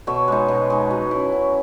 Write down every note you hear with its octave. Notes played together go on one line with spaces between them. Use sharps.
B2 C#5 E5
G#3 D#4
B2
G#3 D#4
F#3
C#4 E4
F#3